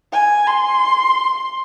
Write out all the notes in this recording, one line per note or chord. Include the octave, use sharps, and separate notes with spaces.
G#5
C6